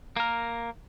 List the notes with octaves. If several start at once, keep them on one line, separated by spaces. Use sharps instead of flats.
A#3 A#4